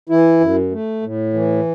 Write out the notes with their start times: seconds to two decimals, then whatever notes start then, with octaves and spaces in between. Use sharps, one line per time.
0.09 E3 E4
0.40 F#2
0.72 A3
1.02 A2
1.34 E3